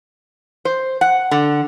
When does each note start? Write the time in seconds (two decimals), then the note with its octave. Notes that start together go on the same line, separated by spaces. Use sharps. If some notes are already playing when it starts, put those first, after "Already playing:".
0.65 C5
1.01 F#5
1.31 D3